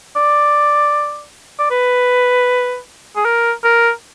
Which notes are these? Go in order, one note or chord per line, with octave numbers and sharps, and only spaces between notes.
D5
D5
B4
G#4
A#4
A#4